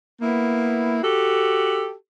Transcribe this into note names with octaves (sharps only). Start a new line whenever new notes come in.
A#3 B3 E4
F#4 G4 A4